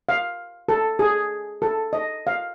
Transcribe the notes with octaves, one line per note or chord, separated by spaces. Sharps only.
F5
A4
G#4
A4
D#5
F5